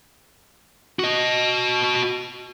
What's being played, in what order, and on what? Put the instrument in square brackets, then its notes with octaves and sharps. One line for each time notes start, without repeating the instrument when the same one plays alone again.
[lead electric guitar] F#4 D#5